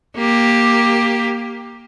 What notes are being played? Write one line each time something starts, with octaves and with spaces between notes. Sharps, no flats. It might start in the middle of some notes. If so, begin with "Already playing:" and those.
A#3 G4